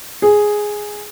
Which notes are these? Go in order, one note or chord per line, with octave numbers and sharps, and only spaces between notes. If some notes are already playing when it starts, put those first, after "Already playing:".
G#4